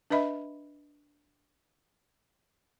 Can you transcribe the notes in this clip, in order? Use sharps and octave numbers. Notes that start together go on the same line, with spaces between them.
D4 B4 D#5 E5 B5